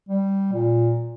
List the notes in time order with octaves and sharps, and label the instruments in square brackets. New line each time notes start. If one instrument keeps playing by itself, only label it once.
[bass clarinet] G3
A#2